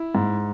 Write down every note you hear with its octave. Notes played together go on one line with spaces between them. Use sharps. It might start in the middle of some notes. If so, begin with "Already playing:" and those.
Already playing: E4
G#2